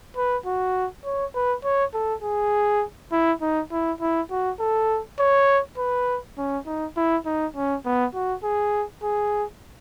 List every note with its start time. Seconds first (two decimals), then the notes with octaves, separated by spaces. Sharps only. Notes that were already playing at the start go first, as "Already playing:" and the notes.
0.16 B4
0.45 F#4
1.04 C#5
1.34 B4
1.64 C#5
1.94 A4
2.23 G#4
3.12 E4
3.41 D#4
3.71 E4
4.01 E4
4.30 F#4
4.59 A4
5.19 C#5
5.77 B4
6.37 C#4
6.66 D#4
6.97 E4
7.26 D#4
7.56 C#4
7.85 B3
8.14 F#4
8.43 G#4
9.03 G#4